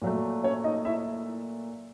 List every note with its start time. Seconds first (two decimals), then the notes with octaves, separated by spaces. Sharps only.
0.02 A#2 F#3 A3
0.43 C#4 C#5
0.64 D#4 D#5
0.85 E4 E5